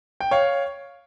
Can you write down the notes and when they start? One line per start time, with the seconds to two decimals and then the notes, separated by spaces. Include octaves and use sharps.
0.20 G5
0.31 C#5 F5